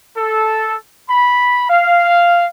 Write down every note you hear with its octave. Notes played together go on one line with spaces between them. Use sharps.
A4
B5
F5